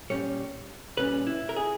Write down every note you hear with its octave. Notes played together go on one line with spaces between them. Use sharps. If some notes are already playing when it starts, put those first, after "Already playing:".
A#2 G3 C#4 C#5
A#2 G3 C#4 B4
E4
A#4
G#4